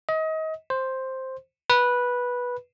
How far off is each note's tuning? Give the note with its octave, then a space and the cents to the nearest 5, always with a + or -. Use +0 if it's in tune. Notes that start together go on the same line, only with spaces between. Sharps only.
D#5 +30
C5 +5
B4 -10